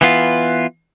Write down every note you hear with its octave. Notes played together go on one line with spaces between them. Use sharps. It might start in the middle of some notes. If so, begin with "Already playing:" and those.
E3 B3 F4